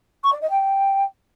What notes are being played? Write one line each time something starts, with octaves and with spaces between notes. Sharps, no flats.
C#6
D5
D#5
G5